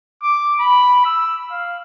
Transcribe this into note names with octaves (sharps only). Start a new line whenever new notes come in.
D6
B5
E6
F5